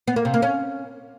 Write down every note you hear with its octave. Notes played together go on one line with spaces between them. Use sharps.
B3
A#3
C3
A#3
C#4